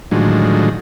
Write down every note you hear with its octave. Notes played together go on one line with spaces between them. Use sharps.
A2 D3 D#3 F3 F#3 G#3